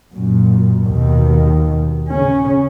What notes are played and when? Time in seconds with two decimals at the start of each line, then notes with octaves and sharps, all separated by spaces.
0.11 F#2 A#2
0.87 D#2 B2 D#3
2.11 C#3 C#4